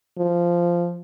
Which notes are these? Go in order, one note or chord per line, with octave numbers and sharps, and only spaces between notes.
F3